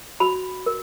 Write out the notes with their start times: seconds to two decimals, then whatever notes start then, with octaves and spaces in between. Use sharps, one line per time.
0.20 F#4 B5
0.66 A#4